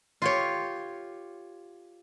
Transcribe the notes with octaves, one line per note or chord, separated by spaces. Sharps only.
F4 G4 C#5